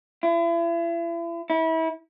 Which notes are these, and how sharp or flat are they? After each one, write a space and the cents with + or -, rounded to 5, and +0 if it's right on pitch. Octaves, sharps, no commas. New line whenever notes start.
E4 +40
E4 -30